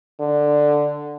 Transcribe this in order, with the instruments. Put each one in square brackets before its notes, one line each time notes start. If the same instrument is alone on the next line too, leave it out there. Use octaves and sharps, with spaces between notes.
[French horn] D3